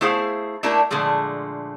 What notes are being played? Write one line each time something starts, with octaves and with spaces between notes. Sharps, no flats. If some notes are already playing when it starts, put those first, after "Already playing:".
A3 E4 G#4 C5 F5
A3 A#3 D4 E4 G4 A#4
A#2 D3 F3 G#3 A3